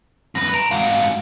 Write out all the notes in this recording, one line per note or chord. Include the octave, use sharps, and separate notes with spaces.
F#2 B4 A#6
A5 A#5 D7
G#2 F#4 F5